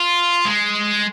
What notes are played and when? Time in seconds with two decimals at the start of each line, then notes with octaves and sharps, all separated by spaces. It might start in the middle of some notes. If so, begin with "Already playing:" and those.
Already playing: F4
0.45 G#3